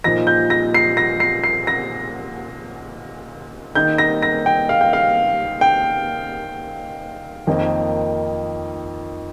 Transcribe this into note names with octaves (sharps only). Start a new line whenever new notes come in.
A#2 F3 D#4 A#6
G6
A#6
C7
A#6
C7
C7
A#6
D#3 A#3 D#4 G6
A#6
A#6
G5
F5
G5
F5
G5
F2 D#3 A#3 D#4